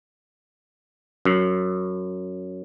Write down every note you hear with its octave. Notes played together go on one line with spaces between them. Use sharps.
F#2